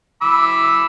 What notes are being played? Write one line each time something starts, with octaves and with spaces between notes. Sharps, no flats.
B5 D6 E6